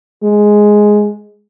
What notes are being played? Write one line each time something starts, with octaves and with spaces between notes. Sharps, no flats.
G#3